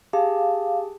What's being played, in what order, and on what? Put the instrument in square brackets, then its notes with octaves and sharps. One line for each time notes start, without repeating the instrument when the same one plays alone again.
[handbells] G4 G#4 A5 [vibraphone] F5